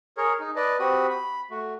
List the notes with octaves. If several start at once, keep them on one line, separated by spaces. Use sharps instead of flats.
G#4 A#4 C#5
D#4
B4 D5 D#5 A5
C4 F#4 G4 B5 D#6
B5
A3 F#4